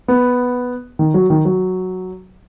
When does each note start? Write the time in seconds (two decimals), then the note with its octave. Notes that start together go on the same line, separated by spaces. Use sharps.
0.08 B3
0.99 D#3
1.14 F#3
1.30 D#3
1.45 F#3